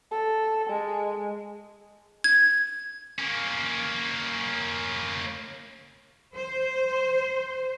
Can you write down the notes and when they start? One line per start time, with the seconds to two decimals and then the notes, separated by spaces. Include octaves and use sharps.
0.11 A4
0.70 G#3
2.24 G#6
3.19 A#3 C#4
6.36 C5